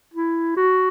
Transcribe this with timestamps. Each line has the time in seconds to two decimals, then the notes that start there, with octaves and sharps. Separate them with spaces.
0.14 E4
0.56 F#4